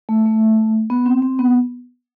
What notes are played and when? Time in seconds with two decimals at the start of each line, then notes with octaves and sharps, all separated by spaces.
0.09 A3
0.25 A3
0.90 B3
1.06 C4
1.22 C4
1.39 B3